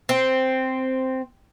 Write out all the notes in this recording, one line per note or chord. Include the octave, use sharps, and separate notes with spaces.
C4